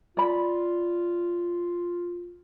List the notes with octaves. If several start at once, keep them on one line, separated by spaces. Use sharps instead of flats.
F4 D5 B5